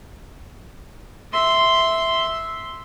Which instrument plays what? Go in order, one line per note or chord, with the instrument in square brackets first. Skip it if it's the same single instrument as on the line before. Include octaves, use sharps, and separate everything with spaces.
[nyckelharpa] E5 C6